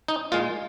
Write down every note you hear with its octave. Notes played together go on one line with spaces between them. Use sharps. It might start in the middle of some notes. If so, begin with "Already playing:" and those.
D#4
A#2 G#3 F4